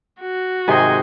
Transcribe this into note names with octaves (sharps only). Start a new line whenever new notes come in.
F#4
G#2 C3 D#3 C5 D#5 G#5